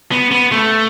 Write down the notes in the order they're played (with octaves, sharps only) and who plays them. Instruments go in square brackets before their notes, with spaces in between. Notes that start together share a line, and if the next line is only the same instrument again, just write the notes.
[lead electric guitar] B3
B3
A3